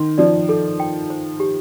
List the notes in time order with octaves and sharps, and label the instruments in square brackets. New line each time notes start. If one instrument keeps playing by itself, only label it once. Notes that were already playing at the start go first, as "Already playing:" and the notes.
Already playing: [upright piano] D#3 [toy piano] C6
[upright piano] F3 [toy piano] D5
[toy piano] A4
G5
C5
G4